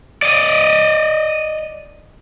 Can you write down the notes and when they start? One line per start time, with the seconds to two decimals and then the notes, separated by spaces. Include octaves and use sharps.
0.22 D5 D#5